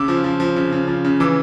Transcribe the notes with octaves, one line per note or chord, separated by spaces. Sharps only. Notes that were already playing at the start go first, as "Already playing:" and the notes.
Already playing: C#3 D6 E6
F3
F3
F3
C#3
C#3
F3
C#3
E3 D6 E6